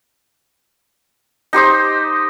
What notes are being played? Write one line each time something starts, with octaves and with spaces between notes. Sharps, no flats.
D#4 G4 C5 D#5